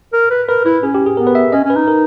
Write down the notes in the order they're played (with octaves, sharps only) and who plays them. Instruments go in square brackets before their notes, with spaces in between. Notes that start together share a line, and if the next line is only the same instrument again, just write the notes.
[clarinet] A#4
B4
[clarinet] A#4 [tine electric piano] B4
[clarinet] E4 [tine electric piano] B4
[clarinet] C#4 [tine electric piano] G#4
[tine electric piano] G4
G#4
[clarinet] B3 [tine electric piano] A#4
[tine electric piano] B4
E5
[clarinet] C#4 [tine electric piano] D#5
[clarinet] C#4
[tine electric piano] B4
[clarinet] D#4
[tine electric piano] A#4